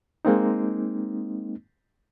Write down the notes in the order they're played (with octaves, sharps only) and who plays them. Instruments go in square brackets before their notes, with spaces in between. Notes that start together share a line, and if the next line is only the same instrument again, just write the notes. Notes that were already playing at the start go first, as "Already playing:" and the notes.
[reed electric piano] G#3 A#3 C4 D#4